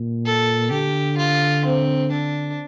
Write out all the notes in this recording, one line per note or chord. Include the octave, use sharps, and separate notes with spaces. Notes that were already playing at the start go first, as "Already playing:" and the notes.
Already playing: A#2
A4
D3 G4
F4
C4
D4